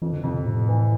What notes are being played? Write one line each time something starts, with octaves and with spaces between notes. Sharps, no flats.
F2 E3
D3
F2 C3
C3
A2 C3
E3